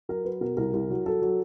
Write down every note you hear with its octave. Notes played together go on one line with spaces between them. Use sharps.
F#3 A#4
F#3 B4
B2 A#4
C2 A#4
C2
F#3
F#3 A4
F#3